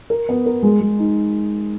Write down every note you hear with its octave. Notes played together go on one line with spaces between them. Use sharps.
A#4
B3
A#4
G#3
G#3
D#4